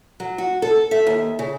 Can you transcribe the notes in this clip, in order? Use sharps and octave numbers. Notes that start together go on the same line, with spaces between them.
F#3
F#4
A4
E5
D#2
C#3